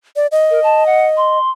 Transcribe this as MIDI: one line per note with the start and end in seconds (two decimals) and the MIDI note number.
0.16 0.27 74
0.32 1.38 75
0.50 0.60 70
0.64 0.86 81
0.86 1.06 78
1.17 1.50 84